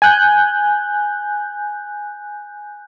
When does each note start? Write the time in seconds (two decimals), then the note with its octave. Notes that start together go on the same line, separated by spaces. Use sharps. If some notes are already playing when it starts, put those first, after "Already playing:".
0.02 G#5 F#6 G6